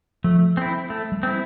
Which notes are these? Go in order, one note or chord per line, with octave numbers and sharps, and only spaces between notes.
F3 A3
C4 E4
A3
G3
C4 E4